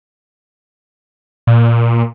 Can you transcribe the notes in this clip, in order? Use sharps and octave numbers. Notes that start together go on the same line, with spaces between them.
A#2